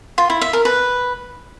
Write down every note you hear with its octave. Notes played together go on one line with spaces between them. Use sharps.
F4
E4
E5
A#4
B4